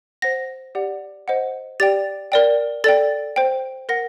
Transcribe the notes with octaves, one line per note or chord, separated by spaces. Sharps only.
C5 F#5 A#6
G4 D5 F#5
C5 D#5 F#5
G4 D5 G5 A6
A#4 D5 G5
A4 D5 G5 A6
C5 G5
A#4 F#5 A#6